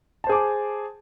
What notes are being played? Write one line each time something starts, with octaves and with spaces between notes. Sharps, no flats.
G#4 C5 G#5 A5 D6